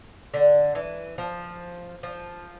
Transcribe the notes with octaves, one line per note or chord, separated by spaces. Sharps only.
D3
E3
F3
F3